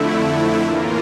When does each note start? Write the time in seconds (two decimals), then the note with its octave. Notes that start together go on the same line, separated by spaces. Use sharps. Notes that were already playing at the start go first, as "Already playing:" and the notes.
Already playing: F2 D3 A3 E4
0.62 A2 E3 A#3 F4 A#4